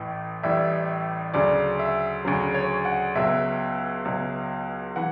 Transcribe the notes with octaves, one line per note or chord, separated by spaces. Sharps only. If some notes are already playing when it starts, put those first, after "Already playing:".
Already playing: A1 A2 E3
A1 A2 E3 G3 E5
D2 C#3 F#3 D5
E5
D2 C#3 F#3
C#5
F#5
C#2 B2 F#3 E5
C#2 B2 F#3
E3 F#5